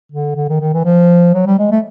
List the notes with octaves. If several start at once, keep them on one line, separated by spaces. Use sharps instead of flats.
D3
D3
D#3
D#3
E3
F3
F#3
G3
G#3
A3